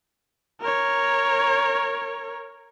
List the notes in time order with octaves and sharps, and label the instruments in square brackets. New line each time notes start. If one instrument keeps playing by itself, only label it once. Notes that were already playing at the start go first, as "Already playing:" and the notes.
[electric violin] A#4 C#5